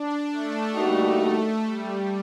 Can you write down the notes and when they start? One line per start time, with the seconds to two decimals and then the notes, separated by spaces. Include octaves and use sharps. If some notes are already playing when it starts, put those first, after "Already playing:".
Already playing: D4
0.31 A3
0.75 D3 G3 A#3 D#4 F#4
1.64 G3